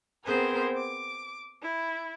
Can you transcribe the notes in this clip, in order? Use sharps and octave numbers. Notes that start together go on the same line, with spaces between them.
B3 C4 G#4 A#4 C5
D6
E4